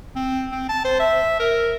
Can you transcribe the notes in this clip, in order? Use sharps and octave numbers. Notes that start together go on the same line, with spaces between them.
C4
C4
A5
C5
E5
A#4